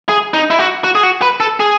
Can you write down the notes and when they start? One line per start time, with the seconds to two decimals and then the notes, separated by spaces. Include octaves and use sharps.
0.09 G#4
0.34 D#4
0.50 E4
0.59 F#4
0.84 F#4
0.95 G#4
1.03 F#4
1.22 B4
1.40 A4
1.60 G#4